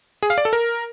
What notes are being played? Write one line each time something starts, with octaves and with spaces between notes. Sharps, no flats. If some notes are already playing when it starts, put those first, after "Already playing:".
G#4
F5
D5
A4
A#4